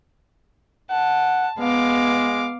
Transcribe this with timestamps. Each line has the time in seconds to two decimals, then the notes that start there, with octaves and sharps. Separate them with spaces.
0.90 F#5 A5
1.59 G#3 B3 F5 D6